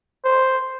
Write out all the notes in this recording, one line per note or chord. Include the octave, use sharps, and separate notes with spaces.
C5